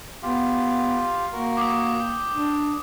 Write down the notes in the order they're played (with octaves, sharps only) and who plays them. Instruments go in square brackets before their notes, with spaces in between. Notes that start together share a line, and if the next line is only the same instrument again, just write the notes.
[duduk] B3 [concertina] F4 G4 F5
[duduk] A#3 [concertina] F#4 A#4
[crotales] D6 D#6
[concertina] G5
[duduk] D4